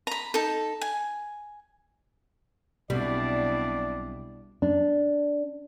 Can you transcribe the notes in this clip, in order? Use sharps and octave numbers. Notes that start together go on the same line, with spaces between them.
A#5 B5
D#4 A4
G#5
B1 B2 G3 C4 D4 E4 D5
D4